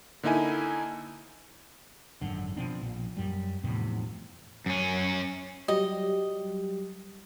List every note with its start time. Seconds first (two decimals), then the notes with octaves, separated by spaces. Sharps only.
0.23 D3 A#3 D#4 E4 G#5
2.21 G#1 F#2 D3
2.56 B2 F3 C4 D4
2.81 A#1
3.17 F#2 G3
3.64 F1 E2 A2 C3
4.66 F#2 C#4
5.68 F#3 G3 G4 D#5